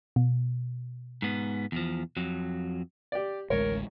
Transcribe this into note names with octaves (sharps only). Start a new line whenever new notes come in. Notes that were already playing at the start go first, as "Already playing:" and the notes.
B2
G#2 B3
E2 F3
F2 F#3
G4 D5
A1 D2 G#3 A#4 C#5